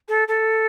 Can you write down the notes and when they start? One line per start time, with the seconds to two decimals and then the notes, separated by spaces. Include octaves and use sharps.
0.09 A4
0.28 A4